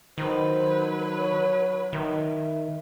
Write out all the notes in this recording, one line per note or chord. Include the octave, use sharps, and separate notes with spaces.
D#3 F#3 B4 C5
C#5
D#3 E5